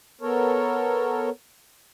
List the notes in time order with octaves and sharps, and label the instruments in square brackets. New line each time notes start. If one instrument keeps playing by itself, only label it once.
[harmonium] B3 A4 A#4 C#5